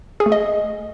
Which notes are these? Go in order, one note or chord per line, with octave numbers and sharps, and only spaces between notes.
G#4
A3
D#5